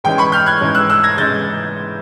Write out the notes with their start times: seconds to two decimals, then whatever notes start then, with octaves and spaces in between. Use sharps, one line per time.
0.04 G#2 E3 G#3 C#4 G5
0.18 B5 C#6
0.32 F6 G6
0.46 F#6 G#6
0.61 G#2 E3 G#3 C#4
0.75 E6 F#6
0.90 E6 F#6
1.03 G#6 A#6
1.17 G#2 E3 G#3 C#4 G6 A6